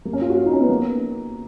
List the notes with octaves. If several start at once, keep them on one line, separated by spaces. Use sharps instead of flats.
A#3
C#4
F4
F#4
F4
D#4
C#4
B3
A#3